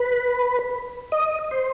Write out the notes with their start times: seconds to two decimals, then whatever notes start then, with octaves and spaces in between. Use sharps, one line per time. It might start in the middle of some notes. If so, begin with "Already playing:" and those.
Already playing: B4
1.12 D#5
1.51 C5